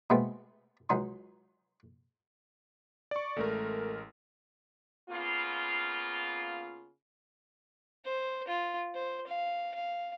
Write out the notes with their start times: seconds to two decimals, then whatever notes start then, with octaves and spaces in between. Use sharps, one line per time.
0.10 B2 G#3 A3 B3 C4
0.90 C#2 F#3 D#4 C6
3.11 D5 C#6
3.37 A1 G#3 A3 A#4
5.10 C#3 A#3 B3 F4
8.05 C5
8.48 F4
8.94 C5
9.27 F5
9.74 F5